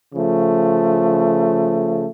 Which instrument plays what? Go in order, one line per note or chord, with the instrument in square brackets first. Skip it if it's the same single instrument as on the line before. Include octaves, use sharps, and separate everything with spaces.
[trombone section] C#3 F3 A3